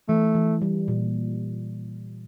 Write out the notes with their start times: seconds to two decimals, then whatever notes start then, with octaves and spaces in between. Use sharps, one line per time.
0.08 E3 A3
0.35 E3
0.62 G3
0.88 A#2